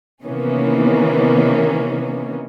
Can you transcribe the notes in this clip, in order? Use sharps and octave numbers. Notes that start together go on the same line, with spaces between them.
C3 D#3 E3 A#3 B3 C#4